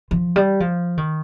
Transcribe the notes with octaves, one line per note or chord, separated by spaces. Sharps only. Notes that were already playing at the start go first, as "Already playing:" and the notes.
F3
G3
F3
D#3